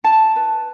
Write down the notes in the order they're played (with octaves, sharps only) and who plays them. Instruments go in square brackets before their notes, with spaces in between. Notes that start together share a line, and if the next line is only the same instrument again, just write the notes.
[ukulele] E4 A5
B4